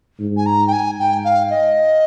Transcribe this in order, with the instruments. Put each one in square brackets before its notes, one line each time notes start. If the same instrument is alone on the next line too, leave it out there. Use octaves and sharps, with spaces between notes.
[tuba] G#2
[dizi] G#5
A#5
G5
G#5
[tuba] G#2 [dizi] G5
[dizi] F5
D#5